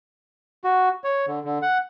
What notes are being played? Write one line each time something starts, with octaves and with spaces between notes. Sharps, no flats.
F#4
C#5
D3
D3
F#5